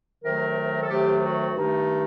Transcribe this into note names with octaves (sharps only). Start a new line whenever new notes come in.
D2 C3 D#3 F#3 A3 A#4
A4
D2 C3 D#3 F#3 A3 G4
F#4
G2 D#3 A3 D#4